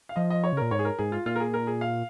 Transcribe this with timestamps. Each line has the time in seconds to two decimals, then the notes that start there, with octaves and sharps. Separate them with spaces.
0.09 F5
0.16 F3 D#5
0.30 D#5
0.44 C#5
0.53 C#3
0.57 A#2 A#4
0.71 G#2 C#5
0.79 G#4
0.85 A#4
0.99 G#2 G#4
1.12 F4
1.26 A#2 F4
1.36 A#4
1.40 G#4
1.54 A#4
1.67 G#4
1.81 F5